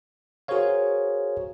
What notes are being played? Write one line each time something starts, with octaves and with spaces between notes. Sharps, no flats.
F#4 G#4 A#4 C5 C#5 F5